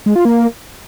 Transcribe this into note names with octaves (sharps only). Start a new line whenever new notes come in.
G#3
F4
A#3